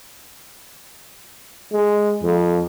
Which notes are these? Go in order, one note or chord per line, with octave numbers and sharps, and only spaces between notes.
G#3
F2